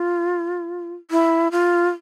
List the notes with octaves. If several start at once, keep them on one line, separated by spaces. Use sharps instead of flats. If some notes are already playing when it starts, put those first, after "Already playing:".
Already playing: F4
E4
F4